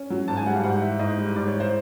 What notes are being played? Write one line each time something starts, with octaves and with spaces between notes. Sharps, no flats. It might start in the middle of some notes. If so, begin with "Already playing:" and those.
Already playing: C#4
F#3
G#2 A5
G#5
G3 F#5
F5
G#2 F#5
E3 E5
G#2 D#5
G3
G#2 D5
C#5
E3
C5